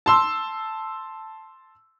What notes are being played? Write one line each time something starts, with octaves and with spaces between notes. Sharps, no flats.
A5 C6 E6